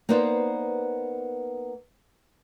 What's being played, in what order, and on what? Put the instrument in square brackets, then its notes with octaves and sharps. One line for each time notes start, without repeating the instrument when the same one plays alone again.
[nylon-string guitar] A#3 B3 D#4 B4 C5 D5